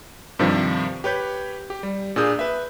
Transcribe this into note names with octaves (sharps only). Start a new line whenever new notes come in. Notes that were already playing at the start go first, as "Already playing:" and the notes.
G2 C3 D#3 F3
G4 B4 C#5 G6
G4
G3
A#2 D4 G#4 D#6 G6
B4 E5